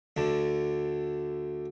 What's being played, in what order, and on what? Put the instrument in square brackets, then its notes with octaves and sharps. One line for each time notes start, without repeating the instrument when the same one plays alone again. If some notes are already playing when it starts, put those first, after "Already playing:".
[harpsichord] D2 D3